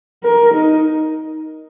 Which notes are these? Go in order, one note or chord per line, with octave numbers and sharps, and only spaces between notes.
A#4
D#4